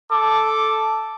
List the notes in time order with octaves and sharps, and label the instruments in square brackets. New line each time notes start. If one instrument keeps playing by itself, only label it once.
[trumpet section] A4 D6